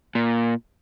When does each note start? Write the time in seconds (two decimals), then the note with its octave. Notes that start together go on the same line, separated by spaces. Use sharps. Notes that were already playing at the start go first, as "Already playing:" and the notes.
0.15 A#2